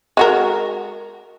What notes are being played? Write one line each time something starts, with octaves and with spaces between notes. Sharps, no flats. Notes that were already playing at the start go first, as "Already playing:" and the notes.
G#3 F#4 A#4